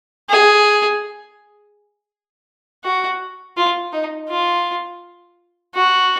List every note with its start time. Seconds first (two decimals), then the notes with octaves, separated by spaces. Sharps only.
0.29 G#4
2.84 F#4
3.57 F4
3.93 D#4
4.29 F4
5.75 F#4